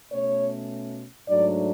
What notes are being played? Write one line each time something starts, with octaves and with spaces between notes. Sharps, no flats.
B2 A3 C#4 C#5
G#2 F#3 A3 D4 D5